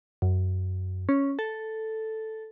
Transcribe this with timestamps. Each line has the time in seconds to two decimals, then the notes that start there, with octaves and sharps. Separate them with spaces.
0.22 F#2
1.09 C#4
1.39 A4